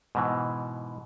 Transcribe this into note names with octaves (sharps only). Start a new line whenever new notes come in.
G#2 B2 E3